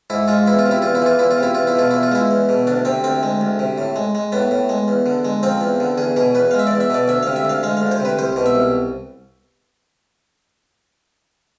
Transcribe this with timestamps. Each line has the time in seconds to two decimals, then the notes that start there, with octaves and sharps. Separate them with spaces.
0.10 G#2 E4
0.28 G#3 F4
0.46 E2 E4
0.59 F4
0.66 C3
0.71 E4
0.82 E2 F4
0.95 E4
1.02 E3 F4
1.19 E2 E4
1.31 F4
1.38 C3 E4
1.55 E2 F4
1.67 E4
1.75 B2 F4
1.91 E2 E4
2.03 F4
2.12 G#3 E4
2.31 E2
2.49 B2
2.67 D2 D4
2.85 C3 C4
3.04 D2 C4
3.23 G#3
3.41 D2
3.59 C3
3.78 A2
3.96 G#3
4.15 G#3
4.32 A2 B3
4.51 A2
4.69 G#3
4.88 E2
5.06 D3
5.25 G#3
5.43 F3 C4
5.61 E2
5.80 D3
5.98 E2 G#4
6.16 B2 G#4
6.35 E2 B4
6.51 G#3 F5
6.59 E5
6.67 E2 D5
6.81 E5
6.90 B2 D5
7.08 D2 E5
7.23 C3 F5
7.36 E5
7.45 D2 F5
7.63 G#3 F5
7.77 D2 F5
7.91 C5
8.00 C3 B4
8.19 C2 C5
8.36 B2
8.46 E5
8.55 C2